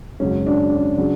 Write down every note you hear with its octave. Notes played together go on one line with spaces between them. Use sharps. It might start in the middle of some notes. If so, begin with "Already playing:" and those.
G#1 F#2 C#3 F#3 C#4
D4
C#4
C#3 F#3 D4